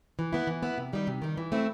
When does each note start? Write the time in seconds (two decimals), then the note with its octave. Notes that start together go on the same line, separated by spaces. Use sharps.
0.19 E3
0.33 B3 E4
0.47 E3
0.63 B3 E4
0.78 C3
0.93 D#3 G3 D#4
1.07 C3
1.22 D#3 G3 D#4
1.37 E3
1.52 A3 C4 E4